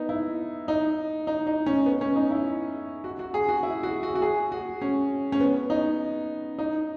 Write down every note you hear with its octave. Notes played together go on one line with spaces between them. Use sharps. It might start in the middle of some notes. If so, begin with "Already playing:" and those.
Already playing: B3 D#4
E4
D#4
D#4
D#4
C#4
B3
C#4
D#4
E4
F#4
F#4
G#4
F#4
E4
F#4
F#4
F#4
G#4
F#4
C#4
C#4
B3
D#4
D#4